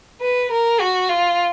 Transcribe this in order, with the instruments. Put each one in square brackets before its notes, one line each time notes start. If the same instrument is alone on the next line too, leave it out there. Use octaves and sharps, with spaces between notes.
[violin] B4
A#4
F#4
F4